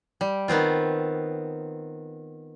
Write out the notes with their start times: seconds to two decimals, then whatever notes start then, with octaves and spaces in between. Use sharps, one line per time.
0.21 G3
0.48 D#3 B3 C4 F4